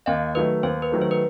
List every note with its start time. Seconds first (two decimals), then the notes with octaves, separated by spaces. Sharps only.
0.06 D#2 D#5 F5
0.35 D#3 F#3 A3 B4
0.63 D#2 C5
0.82 B4
0.92 D#3 F#3 A3
1.01 C5
1.11 B4